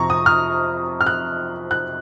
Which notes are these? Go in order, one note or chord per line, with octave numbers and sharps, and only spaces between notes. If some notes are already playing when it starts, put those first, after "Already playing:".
Already playing: F2 C3 F3 C4 A#5 C#6
D#6
F6
F6
F#6
F#6